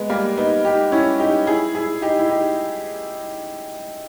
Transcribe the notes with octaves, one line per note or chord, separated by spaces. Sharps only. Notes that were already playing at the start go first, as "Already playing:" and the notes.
Already playing: G#3 B3
G3 A#3
B3 D#4
D#4 G4
C#4 E4
D#4 G4
E4 G#4
E4 G#4
D#4 G4
E4
D#4 G4